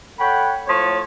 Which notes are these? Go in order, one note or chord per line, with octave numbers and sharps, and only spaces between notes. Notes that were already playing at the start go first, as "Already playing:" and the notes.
A4 C#5 F#5 G5 B5
A2 F3 C#5